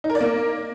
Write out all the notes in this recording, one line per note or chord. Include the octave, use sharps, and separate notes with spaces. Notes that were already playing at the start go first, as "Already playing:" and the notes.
D#4
A#4
D5
A#3